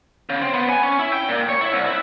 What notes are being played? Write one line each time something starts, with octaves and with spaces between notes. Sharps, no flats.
C#3
C4
B3
G#5
C#4
E4
G5
A#2
C#5
E4
C2
E4